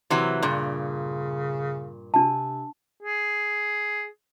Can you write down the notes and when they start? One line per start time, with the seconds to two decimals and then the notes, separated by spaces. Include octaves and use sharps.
0.10 C3 E3 F#3
0.42 G2 A#2 C#3
2.14 C3 D4 A5
3.03 G#4